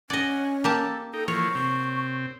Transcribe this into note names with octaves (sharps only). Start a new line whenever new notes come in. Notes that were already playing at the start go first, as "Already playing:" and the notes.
C#4 D5 D#5 F#5 G#5
A#3 G4 A4 A5
D#4 A4 G5
E3 F3 A#3 C#5 C#6
C3 C4